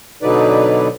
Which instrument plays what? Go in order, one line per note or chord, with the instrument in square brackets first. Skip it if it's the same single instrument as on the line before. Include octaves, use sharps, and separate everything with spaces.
[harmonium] B2 D3 F#3 D#4 B4 D5